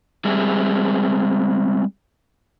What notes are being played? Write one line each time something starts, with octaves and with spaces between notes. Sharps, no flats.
G3 G#3 C4 G#4 E5